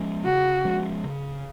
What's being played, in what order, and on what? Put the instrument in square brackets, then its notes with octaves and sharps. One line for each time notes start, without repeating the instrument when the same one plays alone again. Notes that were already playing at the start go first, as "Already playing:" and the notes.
Already playing: [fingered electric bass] F3 G#3 C#4
[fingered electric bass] C#3 [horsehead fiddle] F#4
[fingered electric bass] F3 G#3 C#4
C#3